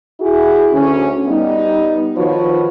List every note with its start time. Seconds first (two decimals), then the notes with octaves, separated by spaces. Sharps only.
0.21 E4 F#4 G#4
0.72 D2 C#4
1.26 G3 B3 D#4
2.15 D#3 F3 F4 F#4 B4 C#5